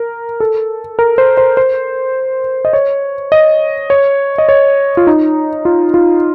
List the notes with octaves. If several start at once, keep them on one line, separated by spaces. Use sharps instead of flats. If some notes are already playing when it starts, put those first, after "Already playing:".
Already playing: A#4
A4
A#4
C5
C5
C5
D#5
C#5
D#5
C#5
D#5
C#5
F4
D#4
F4
F4